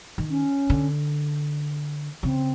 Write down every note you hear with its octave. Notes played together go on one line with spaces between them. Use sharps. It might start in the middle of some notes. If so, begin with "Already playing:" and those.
D#3
C#4
D3
C#3 C4